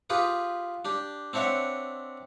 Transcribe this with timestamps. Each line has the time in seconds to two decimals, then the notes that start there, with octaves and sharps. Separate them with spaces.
0.10 F4 G4 G#4 B4
0.85 D4 G4
1.33 C4 D4 C#5 E5 F#5